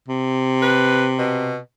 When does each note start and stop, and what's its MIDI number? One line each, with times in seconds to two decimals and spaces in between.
0.08 1.59 48
0.62 1.06 71
1.18 1.57 47